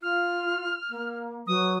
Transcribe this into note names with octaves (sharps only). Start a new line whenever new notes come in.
F4 F6
A#3
F#3 B4 D#6